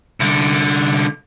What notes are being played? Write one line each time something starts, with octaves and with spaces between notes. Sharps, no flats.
C2 D3